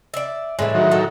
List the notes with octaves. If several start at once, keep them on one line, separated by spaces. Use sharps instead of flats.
D5 E5
A2 E3 G#3 D4 G#5
D#3 F#3
A4